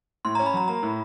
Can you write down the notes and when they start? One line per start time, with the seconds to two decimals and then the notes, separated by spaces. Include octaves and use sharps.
0.25 A2 C6
0.35 A#5
0.39 C#4
0.46 B5
0.54 F#3 A#5
0.68 A#3 A#5
0.83 A2